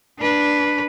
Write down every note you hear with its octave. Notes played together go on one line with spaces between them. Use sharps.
D4 B4